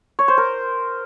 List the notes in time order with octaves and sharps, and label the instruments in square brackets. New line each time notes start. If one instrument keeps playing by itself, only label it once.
[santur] C#5
C5
A#4